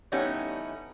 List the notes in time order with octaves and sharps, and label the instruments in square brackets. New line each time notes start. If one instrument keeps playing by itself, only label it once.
[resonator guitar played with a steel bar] E3 G3 A3 B3 C#4 D#4